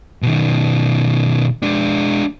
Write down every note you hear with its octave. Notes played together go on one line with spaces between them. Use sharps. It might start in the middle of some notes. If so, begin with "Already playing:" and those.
B2 D#3
G#3 D4